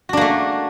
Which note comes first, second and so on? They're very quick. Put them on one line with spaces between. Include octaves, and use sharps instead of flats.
F#4 D4 A#3 A3